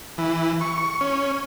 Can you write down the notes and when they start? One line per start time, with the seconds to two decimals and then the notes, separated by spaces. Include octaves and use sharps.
0.18 E3
0.61 C#6
1.01 C#4